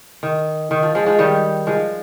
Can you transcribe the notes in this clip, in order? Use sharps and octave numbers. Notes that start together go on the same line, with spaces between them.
D#3
D#3
F3
F3 G#3
F3 G#3
D#3 G3
F3 G#3